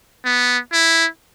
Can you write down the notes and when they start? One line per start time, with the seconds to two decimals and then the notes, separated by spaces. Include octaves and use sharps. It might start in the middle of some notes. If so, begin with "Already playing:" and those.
0.25 B3
0.73 E4